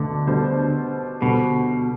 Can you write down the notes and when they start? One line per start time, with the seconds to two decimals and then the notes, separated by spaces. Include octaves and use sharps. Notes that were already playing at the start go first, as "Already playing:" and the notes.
Already playing: D2 B2 D3 D4 A4
0.27 B2 G3 D4 A4 C5
1.21 D2 B2 D3 G3